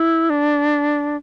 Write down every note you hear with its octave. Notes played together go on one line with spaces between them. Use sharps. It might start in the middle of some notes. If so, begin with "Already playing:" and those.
Already playing: E4
D4